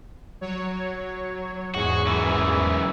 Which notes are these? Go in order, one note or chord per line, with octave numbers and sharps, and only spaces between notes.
F#3 C#5
E2 G#2 F#4 G#4
F#2 E3